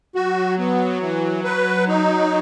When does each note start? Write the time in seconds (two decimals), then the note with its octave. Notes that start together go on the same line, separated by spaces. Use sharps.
0.15 F#3 F#4
0.58 B3
1.01 E3
1.44 B4
1.88 D#4